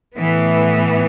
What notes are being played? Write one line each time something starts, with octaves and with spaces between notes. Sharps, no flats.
A2 E3 B3